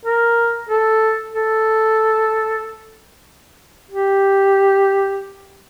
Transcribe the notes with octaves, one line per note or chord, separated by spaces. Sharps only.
A#4
A4
A4
G4